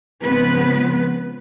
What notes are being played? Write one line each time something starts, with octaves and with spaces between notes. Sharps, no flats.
G#2 C#3 F3 B3 C4 B4